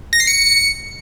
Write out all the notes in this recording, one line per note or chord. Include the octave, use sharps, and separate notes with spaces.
A#6
C7
C#7